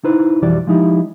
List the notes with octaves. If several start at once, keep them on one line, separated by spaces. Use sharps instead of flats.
D#4 E4 B4 C5
B1 F2 E3 G3 F#4 D5
F3 G#3 D#4 E4 G4